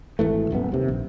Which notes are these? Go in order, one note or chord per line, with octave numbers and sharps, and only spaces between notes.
G#1 E3 A3
D#1 F#2 A3 B3
D#2 C3
A#1